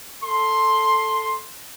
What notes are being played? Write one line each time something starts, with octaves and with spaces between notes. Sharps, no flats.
A4 C6